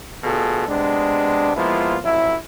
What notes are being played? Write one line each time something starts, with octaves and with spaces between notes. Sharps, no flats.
D2 B2 F4 G#4 A4
C3 G#3 B3 D4
F3 G#3 A#3 B3 E4 F4
A1 F2 F#3 E4